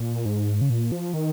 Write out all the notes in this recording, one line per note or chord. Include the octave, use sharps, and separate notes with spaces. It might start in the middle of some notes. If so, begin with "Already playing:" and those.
Already playing: A#2
G#2
C#3
A#2
F3
D#3